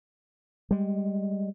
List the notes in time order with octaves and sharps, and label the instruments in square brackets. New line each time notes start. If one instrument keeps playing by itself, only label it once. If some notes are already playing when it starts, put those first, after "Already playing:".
[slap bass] G3 G#3